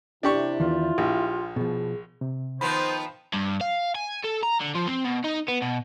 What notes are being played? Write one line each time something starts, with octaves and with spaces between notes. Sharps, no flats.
C3 D4 E4 G4 C#6
E2 D#3 E3 F4
A#1 G4
B2 F3 G#4
C3
D#3 F3 B3 C5 B5
G2
F5
G#5
A4
A#5
D3
F3
C4
B2
D#4
B3
B2